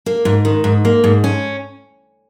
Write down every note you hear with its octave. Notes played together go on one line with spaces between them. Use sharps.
A#3
G#2
D#3
G#2
A#3
G#2
C#4